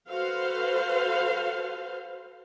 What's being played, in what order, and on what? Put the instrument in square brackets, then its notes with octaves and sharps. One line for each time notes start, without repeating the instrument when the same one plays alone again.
[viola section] F#4 A4 B4 C5 F5